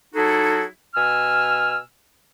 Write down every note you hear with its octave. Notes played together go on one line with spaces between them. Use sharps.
F#3 D#4 E4 F#4 G#4 A4
B2 G#5 E6 F6